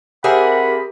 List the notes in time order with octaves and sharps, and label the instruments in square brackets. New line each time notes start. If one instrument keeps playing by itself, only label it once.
[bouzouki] C4 G#4 E5 [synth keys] G4 A#4 [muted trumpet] F#5 [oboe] B5